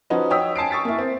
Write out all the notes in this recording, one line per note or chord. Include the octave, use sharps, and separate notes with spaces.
F3 C#4 D#4 F#4 B4 D#5
C#5 D#5 G5 D#6 E6 B6
G#5 A5 C7 D7
C#6 D#6 A6 B6
A#3 E4
C4